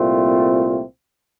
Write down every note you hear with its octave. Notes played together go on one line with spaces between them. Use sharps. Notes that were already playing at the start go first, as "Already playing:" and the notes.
Already playing: C2 A#2 A3 C4 F4